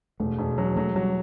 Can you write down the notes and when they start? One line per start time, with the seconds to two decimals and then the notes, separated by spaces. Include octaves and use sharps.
0.20 E1 A3
0.38 E1
0.58 F#3
0.76 F#3 A3
0.95 F#3 G3